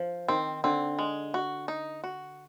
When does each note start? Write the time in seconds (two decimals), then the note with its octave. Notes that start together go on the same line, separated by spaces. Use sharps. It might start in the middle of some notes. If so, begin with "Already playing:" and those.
Already playing: F3
0.28 D#3 C4
0.64 D3 C4
0.99 G#3
1.34 F#4
1.68 D#4
2.04 F#4